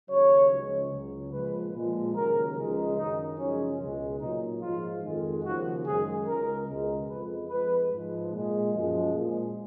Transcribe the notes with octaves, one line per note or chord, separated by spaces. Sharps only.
D#2 C#3 F#3 C#5
C#2 C#3 F3 G#3
C#2 C#3 F#3
A#2 F3 G#3 B4
A#2 F3 G#3
D#2 C#3 F#3 A#4
C#2 C#3 F3 G#3
F#2 D#3 F#3 D#4
F#2 C#3 F3 G#3 C#4
C#2 B2 G#3
A#2 F#3 D#4
G#2 F3 G#3 F4
F2 D#3 G#3
D#2 C#3 F3 F#4
F#2 D#3 G#3 G#4
C#2 C#3 G#3 A#4
C#2 B2 G#3
F2 F3 G#3 B4
F2 F3 G#3 B4
G#2 F3 G#3
A#2 G#3
F#2 F3 G#3
A#2 G#3